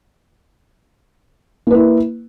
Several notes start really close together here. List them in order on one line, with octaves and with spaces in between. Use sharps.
A#3 B4 E4